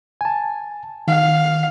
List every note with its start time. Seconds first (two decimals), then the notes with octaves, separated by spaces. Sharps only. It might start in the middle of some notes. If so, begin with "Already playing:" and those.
0.21 G#5 A5
1.08 D#3 F5